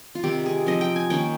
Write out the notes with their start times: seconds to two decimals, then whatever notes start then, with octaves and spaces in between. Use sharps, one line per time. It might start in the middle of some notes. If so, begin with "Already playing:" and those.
0.15 F4
0.23 C3 D#3 G3 C4 G4
0.46 G#4
0.66 F3 C4 D#4 D#5
0.81 G5
0.96 G#5
1.10 D#3 A#3 C#4 G5